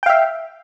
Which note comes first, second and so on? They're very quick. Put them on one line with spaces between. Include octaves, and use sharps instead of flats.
G5 F5 E5